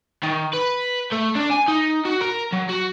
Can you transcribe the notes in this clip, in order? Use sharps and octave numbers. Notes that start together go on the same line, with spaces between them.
D#3
B4
A3
D4
G#5
D#4
F#4
A#4
F#3
F#4